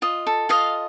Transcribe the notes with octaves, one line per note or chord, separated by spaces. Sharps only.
F4 D#5
A4
F4 D#5 F5